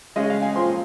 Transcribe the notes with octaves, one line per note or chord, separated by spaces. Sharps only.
C#3 G#3 C#4 D#5
F5
G#5
A#2 F3 C4 C6